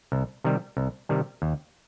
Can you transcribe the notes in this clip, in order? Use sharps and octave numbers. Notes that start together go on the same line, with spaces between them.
C2
C3 D#3 G3
C2
C3 D#3 G3
D#2